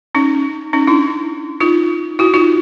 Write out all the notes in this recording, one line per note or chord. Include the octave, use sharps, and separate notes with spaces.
C#4 D#4
C#4 D#4
D4 E4
D#4 F4
E4 F#4
D#4 F4